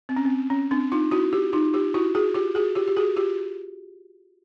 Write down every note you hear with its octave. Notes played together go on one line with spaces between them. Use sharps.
C4
C#4
C4
C#4
C4 D4
D#4 F4
E4 F#4
F4 G4
D#4 F4
F4 G4
E4 F#4
F#4 G#4
F4 G4
F#4 G#4
F4 G4
G4
F#4 G#4
F4 G4